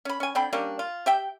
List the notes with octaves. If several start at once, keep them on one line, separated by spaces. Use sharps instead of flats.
C#4 B5
C#4 G#5
D3 C4 G5 B5
G3 A#3 C#4 D4
F4
G4 E5 G5